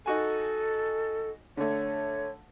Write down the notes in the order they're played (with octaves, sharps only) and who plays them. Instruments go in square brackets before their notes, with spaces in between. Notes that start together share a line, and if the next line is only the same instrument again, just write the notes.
[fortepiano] D#4 F#4 G#5 [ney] A4
[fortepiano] D3 A3 [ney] C#5